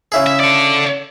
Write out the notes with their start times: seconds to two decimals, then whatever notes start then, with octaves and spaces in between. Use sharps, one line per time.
0.12 C#3 E4 G#4
0.27 E5
0.40 A4 D5